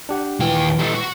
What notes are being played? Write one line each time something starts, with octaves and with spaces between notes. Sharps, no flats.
D4 G4 F#5
D#2 A#2 E3 G5
G3 A4
F#4